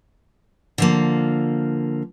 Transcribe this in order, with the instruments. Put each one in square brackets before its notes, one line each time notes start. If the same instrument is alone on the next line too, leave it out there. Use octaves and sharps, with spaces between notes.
[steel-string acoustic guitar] D3 F3 A#3